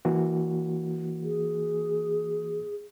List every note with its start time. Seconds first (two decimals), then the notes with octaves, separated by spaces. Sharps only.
0.05 E3 A#3 F#4
1.23 G#4